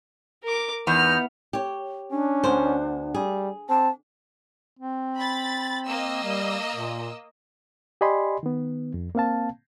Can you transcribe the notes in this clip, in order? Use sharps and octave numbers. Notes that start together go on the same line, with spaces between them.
A#4 D6
E2 B3 D#4 F6 G6
G4 C#5
C#4 D4
D2 B3 C5
G3 G#4
C4 A5
C4
B5 A6
A#3 D#5 E6
G3
A#2
G4 D5 D#5 G#5 B5 C6
D#3 B3
F2
A#3 C4 F5 A5